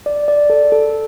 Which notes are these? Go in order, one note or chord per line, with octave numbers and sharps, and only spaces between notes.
D5
D5
A4
A4